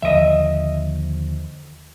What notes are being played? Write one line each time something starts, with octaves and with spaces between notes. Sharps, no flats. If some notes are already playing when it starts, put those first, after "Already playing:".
D#2 D3 F3 D#5 E5